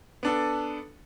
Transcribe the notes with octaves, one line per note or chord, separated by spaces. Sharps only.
B3 D4 A4